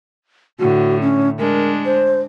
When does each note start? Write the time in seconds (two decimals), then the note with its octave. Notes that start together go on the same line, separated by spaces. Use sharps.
0.59 A2 D3 F#4
1.01 C#4
1.39 G#3 D4 A#4
1.85 C5